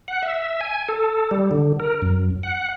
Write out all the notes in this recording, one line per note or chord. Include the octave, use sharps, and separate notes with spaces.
F#5
E5
G#5
A4
G3
D3
A#4
F#2
F#5